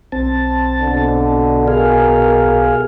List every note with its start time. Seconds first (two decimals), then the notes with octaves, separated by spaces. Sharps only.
0.12 B1 C4 A5
0.81 B2 D3
1.68 G#4 A#4 F5